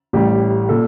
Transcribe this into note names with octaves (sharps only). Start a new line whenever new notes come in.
A1 A2 G3 G4
A#2 A4